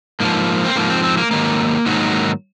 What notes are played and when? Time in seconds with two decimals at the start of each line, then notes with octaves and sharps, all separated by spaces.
0.20 G#2 F3 A#3
0.65 C4
0.76 G#2 F3 A#3
0.90 C4
1.03 C4
1.17 A#3
1.31 G#2 D#3 F#3 A#3
1.86 G#2 D#3 F#3